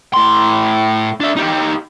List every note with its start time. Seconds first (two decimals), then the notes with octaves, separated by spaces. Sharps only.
0.14 A2 C6
1.20 D4 E5
1.37 D#4 G4